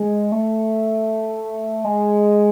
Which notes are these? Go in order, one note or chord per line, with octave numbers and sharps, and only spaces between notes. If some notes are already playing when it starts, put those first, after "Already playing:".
Already playing: G#3
A3
G#3